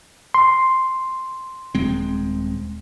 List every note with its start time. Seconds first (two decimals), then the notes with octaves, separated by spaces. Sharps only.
0.34 C6
1.75 D#1 G#3 C4